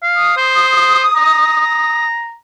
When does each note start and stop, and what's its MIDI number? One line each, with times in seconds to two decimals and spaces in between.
0.03 0.37 77
0.16 2.04 87
0.37 1.04 72
1.16 2.36 82